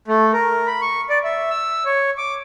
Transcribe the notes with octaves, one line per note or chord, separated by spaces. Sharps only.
A3
A#4
B5
C#6
D5
E5
E6
C#5
D6